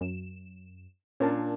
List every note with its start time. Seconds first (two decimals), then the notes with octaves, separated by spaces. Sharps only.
0.01 F#2 E7
1.20 A#2 C#4 D4 A#4 A5